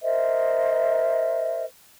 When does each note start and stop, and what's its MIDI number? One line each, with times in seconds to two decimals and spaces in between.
0.03 1.65 70
0.03 1.65 72
0.03 1.65 75
0.03 1.65 76